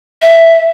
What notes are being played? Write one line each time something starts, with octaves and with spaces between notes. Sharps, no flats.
E5